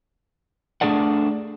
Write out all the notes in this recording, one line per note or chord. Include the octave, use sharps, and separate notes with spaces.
A3 D4 G#4 A4 D5 F#5